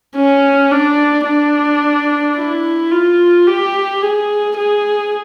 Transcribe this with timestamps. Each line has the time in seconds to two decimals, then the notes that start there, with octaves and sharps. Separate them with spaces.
0.16 C#4
0.71 D4
1.26 D4
2.37 E4
2.91 F4
3.47 G4
4.02 G#4
4.57 G#4